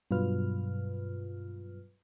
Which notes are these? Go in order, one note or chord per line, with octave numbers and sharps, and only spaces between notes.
G2 B2 F#3 F4 B4 F6